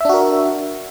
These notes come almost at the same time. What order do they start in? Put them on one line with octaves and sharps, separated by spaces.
E5 D4 F#4 A#4